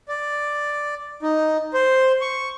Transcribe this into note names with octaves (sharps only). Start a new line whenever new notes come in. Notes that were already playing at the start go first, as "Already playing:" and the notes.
D5
D#4
C5
C#6